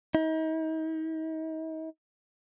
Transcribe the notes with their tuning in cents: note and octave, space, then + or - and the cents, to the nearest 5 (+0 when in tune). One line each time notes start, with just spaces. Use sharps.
D#4 +40